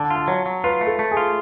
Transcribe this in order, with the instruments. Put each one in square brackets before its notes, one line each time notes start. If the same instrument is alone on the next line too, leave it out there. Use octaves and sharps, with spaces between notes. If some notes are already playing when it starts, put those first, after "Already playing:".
Already playing: [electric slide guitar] D3 [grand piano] A5
[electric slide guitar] F4
[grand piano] A5
[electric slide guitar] F#3 [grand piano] C#5
[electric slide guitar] F#3
[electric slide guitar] F4 [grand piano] B4
[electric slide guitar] A3
[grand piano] A4
[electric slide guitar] A3
[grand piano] G#4
[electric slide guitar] F4